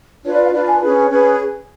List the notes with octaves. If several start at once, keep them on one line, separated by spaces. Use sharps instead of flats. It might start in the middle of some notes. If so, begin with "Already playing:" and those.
D4 F4 B4 C#5
D5
F5
D4 F4 B4 D5
G#5
C#4 G#4 B4
C#4 G#4 B4